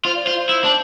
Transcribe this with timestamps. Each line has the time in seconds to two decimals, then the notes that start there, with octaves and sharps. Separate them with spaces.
0.05 F4 C5
0.15 D5
0.25 F4 C5
0.49 E4
0.64 D4